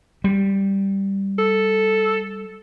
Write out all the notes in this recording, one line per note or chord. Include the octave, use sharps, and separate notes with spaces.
G3
A4